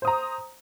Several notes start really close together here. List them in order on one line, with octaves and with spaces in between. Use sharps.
C5 D#6 A#5